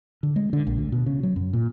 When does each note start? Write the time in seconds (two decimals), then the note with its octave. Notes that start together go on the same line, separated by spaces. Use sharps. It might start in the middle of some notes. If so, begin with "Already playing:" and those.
0.23 D3
0.36 G#3
0.53 D3
0.67 A#1
0.78 D2
0.92 B2
1.06 C#3
1.23 F#3
1.36 F#2
1.53 A#2